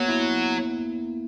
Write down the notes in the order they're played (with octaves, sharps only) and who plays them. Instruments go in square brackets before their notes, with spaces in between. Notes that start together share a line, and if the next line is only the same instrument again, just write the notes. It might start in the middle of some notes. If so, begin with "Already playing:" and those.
Already playing: [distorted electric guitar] F#3 [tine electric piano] A#3 B3
[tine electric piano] E4